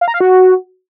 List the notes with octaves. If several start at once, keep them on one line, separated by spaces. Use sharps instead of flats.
F5
A#5
F5
F#4